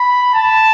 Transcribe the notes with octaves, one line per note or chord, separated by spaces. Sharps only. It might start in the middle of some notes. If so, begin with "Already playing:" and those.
Already playing: B5
A5